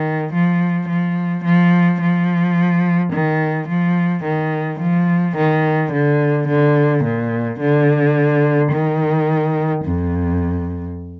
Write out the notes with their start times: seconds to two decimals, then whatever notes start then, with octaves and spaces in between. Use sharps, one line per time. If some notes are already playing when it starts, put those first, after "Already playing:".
Already playing: D#3
0.33 F3
0.89 F3
1.45 F3
2.01 F3
3.13 D#3
3.68 F3
4.24 D#3
4.80 F3
5.37 D#3
5.92 D3
6.48 D3
7.04 A#2
7.60 D3
8.72 D#3
9.85 F2